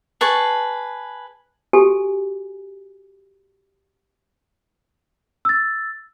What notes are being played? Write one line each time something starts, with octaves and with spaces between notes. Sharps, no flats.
G#4 B4 A5 C#6
F#4 G4 A4 G#5
E6 A6